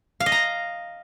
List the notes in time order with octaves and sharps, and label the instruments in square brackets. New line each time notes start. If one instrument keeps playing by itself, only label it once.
[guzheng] F5
D#5
A#5